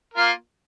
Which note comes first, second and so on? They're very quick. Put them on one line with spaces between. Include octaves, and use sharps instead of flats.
A#4 F4 A#3